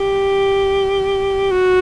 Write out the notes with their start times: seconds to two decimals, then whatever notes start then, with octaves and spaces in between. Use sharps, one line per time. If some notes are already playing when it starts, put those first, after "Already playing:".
Already playing: G4
1.51 F#4